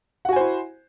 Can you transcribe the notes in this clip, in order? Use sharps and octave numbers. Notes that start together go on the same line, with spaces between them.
E4 F#4 C5 F#5 G#5